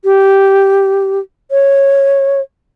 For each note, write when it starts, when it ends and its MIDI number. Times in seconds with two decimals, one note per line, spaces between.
0.05 1.20 67
1.51 2.41 73